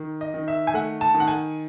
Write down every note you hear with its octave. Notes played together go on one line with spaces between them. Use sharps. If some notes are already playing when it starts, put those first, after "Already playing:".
Already playing: D#3
D#5
D#3
E5
G#5
A3 F#5
A5
D#3
F#5
G#5